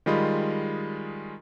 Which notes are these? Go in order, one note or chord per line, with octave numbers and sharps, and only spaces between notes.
D#3 G3 G#3 F4 D#5 B5